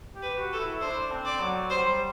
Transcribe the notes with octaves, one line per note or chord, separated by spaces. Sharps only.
G4
B4
F#4
A4
E4
D4 C5
C4
D5
F#3
G3 C5